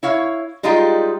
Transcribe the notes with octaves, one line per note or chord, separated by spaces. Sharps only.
E4 C#5 F5
G3 G#3 D#4 F4 G4